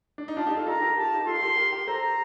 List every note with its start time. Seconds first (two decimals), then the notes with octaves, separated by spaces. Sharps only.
0.18 D4
0.28 D#4
0.37 D4 F4 A5
0.47 D#4 G4
0.57 F4 A4
0.67 F4 A4 A#5
0.82 G4 A#4
0.97 G4 A5
1.06 F4
1.14 D#4 G4
1.27 F4 A4 C6
1.42 G4 A#4
1.57 G4 A#4
1.72 G4 A#4
1.88 A4 C5 A#5